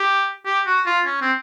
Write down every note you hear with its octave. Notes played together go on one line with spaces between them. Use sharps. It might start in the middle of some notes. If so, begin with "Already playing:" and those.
Already playing: G4
G4
F#4
F4
C#4
C4